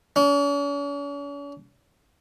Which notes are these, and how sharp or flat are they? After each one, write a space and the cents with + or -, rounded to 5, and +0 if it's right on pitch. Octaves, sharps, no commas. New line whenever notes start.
C#4 +45